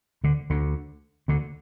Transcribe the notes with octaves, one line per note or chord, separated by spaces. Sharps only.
D2 D3
D2 D3
D2 D3